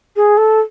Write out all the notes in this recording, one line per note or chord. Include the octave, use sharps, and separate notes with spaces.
G#4
A4